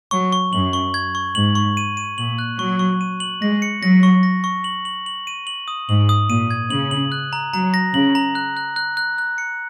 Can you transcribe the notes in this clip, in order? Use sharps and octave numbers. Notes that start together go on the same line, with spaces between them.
F#3 C#6
C#6
F#2 F#7
C#6
G#6
C#6
G#2 F#7
C#6
D#7
D#7
A#2 F#7
F#6
F#3 C#6
C#6
D#7
F#7
G#3 A#6
C#7
F#3 A#6
C#6
A#6
C#6
F#7
F#7
F#7
D#7
F#7
D#6
G#2 F#7
D#6
A#2 D#7
G#6
C#3 F#7
F#7
F#6
A#5
F#3 A#5
A#6
C#3 F#7
A#5
F#6
F#6
F#6
F#6
F#6
C#7